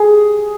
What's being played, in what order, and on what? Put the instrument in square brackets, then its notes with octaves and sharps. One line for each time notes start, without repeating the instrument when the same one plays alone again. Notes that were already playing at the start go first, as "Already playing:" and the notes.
Already playing: [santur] G#4